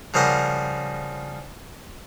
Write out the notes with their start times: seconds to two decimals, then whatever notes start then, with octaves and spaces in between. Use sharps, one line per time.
0.14 C#3 F3 G3 A#4 F#5